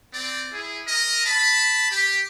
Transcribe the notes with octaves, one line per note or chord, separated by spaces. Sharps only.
C4 D5
E4 G#4
A#4 D#5
A5 B5
G4